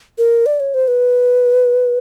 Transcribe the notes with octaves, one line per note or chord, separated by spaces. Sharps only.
A#4
D5
C#5
C5
B4